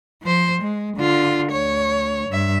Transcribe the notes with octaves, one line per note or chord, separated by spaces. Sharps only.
F3 C5
G#3
D3 F4
D2 C#5
G2 E5